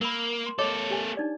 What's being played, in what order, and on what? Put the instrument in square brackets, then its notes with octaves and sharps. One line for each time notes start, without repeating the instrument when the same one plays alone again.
[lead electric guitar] A#3 [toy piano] A#4 B5
[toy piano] C6
[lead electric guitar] A#3 A4 [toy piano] C#5 D#5 D6
[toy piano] G4 G#5
D4 D#4 D5